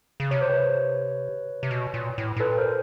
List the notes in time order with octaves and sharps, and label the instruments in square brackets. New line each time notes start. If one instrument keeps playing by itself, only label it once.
[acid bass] C#3
[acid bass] C3 [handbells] C#5
[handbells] C5
B4 C#5
[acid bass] C3
B2
A#2
A2
A2
[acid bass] A#2 [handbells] A4 B4
[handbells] A#4 C5